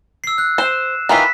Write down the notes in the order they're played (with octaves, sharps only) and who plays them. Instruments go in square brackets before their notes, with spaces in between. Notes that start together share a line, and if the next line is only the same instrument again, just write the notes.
[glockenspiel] E6 C7
F#6
[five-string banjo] C5 [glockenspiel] E7
[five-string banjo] D#3 E3 F4 [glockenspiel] F6 B6